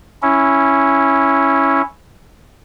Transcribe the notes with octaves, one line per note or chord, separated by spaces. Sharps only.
C#4 E4